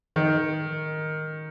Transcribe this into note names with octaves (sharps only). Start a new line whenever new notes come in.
D#3